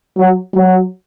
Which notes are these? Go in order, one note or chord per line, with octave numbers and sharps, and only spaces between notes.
F#3
F#3